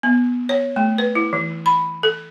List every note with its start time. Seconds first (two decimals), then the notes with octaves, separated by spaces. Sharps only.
0.03 B3
0.49 C#5
0.76 A3
0.98 B4
1.15 E4
1.33 E3
1.66 B5
2.03 A4